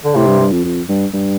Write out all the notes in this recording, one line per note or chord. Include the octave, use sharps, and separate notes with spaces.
D3
A2 C3
G2
G2
F2
F2
G2
G2